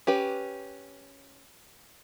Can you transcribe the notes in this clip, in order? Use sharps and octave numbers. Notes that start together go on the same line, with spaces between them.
C#4 G4 B4